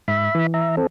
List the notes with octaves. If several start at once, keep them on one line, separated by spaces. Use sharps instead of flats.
G#2 E5 B5
E3
E5 A#5
C4 A4